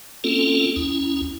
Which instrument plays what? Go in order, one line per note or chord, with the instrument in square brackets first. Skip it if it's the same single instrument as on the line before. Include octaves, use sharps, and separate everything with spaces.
[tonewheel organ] A#3 C4 C#4 F4 A4
D#2 C#4 E4